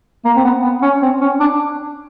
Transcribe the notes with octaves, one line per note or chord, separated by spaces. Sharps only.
A#3
C4
B3
B3
C#4
C4
C#4
D4